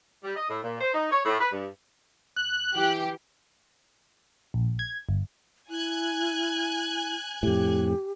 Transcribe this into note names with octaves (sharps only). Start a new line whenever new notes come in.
G3
D#5
A2
A#2
C5
D#4
C#5
A2
B4
G2
F#6
E3 G4
A#1
G#6
G1
E4 G#5 F#6 G#6
F2 A2 G4